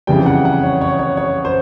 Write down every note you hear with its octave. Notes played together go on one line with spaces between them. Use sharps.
F2 C#3 E3 G3 G5
F#5
F#5
C#5
C#5
C#5
C#5
C5